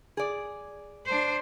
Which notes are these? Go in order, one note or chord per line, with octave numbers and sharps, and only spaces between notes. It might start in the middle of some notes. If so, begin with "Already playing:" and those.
G#4 D5
D4 C5